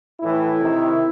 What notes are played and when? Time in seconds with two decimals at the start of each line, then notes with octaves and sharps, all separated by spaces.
0.21 A2 E3 E4
0.60 C3 D#3